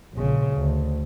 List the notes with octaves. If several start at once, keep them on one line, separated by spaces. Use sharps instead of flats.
A#1 C#3
D2